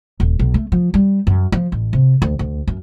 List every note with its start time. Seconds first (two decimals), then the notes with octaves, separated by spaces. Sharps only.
0.20 D#1
0.39 B1
0.54 A3
0.72 F3
0.94 G3
1.27 F#2
1.52 F3
1.72 A1
1.93 C3
2.22 D2
2.39 D2
2.67 F#2